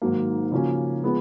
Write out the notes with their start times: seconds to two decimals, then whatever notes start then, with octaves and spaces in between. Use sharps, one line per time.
0.02 G#2 D#3 F#3 A#3
0.51 C#3 F3 A#3 C#4 F#4
1.03 F3 G#3 B3